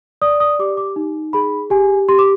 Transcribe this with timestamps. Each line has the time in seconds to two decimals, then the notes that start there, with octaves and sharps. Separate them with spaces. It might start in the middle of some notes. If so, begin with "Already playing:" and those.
0.22 D5 D#6
0.40 D#6
0.59 G4 D6
0.77 D6
0.96 D#4
1.33 G#4 B5
1.70 G4 G#5
2.08 G4 C6
2.19 D6